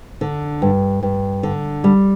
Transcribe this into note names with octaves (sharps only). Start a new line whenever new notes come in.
D3
G2
G2
D3
G3